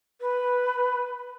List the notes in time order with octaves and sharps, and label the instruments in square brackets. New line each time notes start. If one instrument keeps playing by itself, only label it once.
[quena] B4